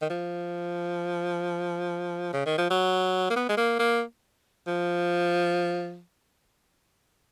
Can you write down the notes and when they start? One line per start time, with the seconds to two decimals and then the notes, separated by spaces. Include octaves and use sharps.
0.02 D#3
0.10 F3
2.33 C#3
2.46 D#3
2.58 F3
2.70 F#3
3.30 A#3
3.36 B3
3.49 G#3
3.57 A#3
3.79 A#3
4.67 F3